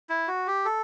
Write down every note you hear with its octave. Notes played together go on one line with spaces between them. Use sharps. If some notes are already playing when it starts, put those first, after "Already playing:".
E4
F#4
G4
A4